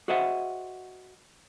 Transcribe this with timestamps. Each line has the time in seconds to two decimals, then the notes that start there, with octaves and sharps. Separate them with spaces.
0.08 F#4 G#4 C5 D#5 E5 F#5